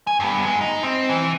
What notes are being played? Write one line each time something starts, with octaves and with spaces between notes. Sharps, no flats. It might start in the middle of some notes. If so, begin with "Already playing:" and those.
G#5
G2 B3
G#3
D#4
C4
E3